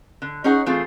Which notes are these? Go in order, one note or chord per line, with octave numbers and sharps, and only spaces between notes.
D3
C#4 D#4 G#4 C#5 F#5
E3 A3 C4 F4 G#4